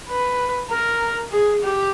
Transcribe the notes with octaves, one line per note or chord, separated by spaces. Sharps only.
B4
A#4
G#4
G4